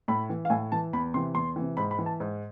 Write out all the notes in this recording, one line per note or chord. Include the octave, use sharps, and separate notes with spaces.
A2 B5
E3
F5
A2 G#5
E3 A5
E2 B5
C3 E3 C6
E2 C6
C3 E3
G#2 B5
B5
E3
A5
G#2